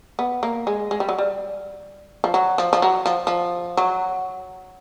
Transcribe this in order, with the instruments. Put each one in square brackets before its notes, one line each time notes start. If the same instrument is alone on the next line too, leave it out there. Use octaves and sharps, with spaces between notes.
[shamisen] B3
A#3
G#3
G#3
G3
F#3
G3
F3
F#3
F3
F3
F#3
F3
F3
F#3